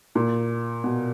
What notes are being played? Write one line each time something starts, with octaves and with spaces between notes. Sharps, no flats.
A#2
B2